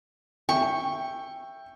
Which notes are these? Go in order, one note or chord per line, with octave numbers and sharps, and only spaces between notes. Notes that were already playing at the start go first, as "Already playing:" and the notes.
E5 G5 C#6